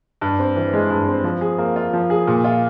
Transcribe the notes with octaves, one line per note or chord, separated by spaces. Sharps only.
G2
C4
E3
G#3
G2
C4
F3
G#4
A#3
F4
F3
G#4
A#2
F4